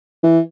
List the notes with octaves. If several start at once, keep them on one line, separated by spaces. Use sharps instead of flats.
E3